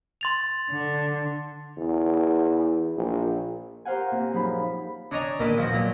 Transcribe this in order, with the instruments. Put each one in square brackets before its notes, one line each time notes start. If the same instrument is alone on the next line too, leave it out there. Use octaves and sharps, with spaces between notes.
[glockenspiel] C6 A6 F7
[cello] D3
[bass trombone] E2
A#1
[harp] G4 A#4 C5 F5 F#5 G#5
A#2 C4
F#2 F3 D#4 G#4 B5
[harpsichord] D4 C#5 D#5 G#5 A#5
A#1 D#3 B4 A5
F3 F#4
A#2 F#3